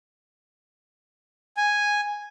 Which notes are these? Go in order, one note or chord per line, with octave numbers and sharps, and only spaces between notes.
G#5